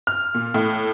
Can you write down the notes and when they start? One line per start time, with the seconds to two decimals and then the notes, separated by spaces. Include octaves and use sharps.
0.07 F6
0.35 A#2
0.54 A2